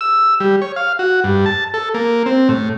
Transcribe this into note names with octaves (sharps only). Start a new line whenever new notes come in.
E6
G3
C#5
F5
F#4
G2
A5
A4
A#3
C4
A2